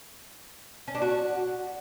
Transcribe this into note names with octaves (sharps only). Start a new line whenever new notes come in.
C#4
D4
F#4